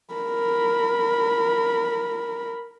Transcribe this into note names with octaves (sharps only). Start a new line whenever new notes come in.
A#4 B5